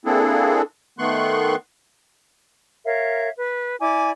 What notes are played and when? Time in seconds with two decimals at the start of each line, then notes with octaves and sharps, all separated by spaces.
0.05 A#3 C4 D4 E4 G#4 A4
0.99 D#3 A3 B3 C6 C#6 F#6
2.85 A#4 C#5 E5 F5
3.36 B4
3.80 E4 D5 G#5 D6